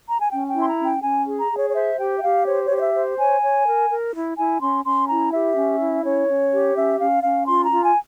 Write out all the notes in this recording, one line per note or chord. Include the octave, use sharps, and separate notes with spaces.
A#5
G#5
C#4 G5
G5
E4 C6
A#5
C#4
G5
C#4 G#5
G#4
A#5
G#4
C#5
C#5
C5 E5
G4 G5
E5
G4 F5
C5 C#5
C#5
G4
C#5
E5
C5
C#5 G#5
C#5
A#4
A#4
E4
E4 G#5
C#4 C6
C#4 C6
E4 A#5
G4 E5
C#4
E4
C#4 C#5
C#4
G4
C#4 E5
C#4 F5
C#4 F5
F4 C6
A#5
F4
G#5